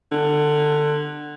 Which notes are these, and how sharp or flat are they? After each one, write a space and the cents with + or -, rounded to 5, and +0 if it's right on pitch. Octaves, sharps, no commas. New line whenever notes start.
D3 +20